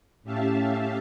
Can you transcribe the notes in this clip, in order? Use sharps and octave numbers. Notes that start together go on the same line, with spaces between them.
A2 C#4 G4 E5 F5 A5